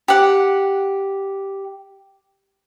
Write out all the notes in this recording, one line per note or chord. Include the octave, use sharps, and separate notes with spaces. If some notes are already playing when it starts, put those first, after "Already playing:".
G4 F#5